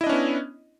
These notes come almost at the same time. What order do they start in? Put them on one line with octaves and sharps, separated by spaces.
E4 D#5 D4 C#4 B3